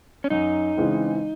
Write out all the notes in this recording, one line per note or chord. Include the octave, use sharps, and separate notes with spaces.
C#4
F#2 D#4
C#3 E3 G#3 C4